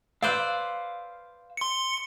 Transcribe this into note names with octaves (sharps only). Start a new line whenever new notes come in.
B4 C5 D5 F5 E6
C6 C#7